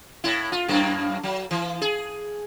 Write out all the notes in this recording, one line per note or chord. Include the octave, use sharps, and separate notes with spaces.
A2 E4
F4
F#2 A2 A#3
F#3
E3
G#4